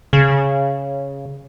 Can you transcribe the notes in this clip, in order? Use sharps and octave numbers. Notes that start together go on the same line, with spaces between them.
C#3